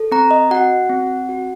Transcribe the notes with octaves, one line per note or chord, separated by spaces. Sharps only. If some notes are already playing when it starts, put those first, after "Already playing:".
Already playing: A4
C4 A#5
D#5
F#4 F#5
C4
F#4